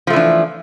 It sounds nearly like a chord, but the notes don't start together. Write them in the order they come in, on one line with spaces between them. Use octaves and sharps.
F3 A3 E3 D4